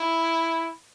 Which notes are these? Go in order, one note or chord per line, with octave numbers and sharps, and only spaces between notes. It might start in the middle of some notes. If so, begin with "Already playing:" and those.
Already playing: E4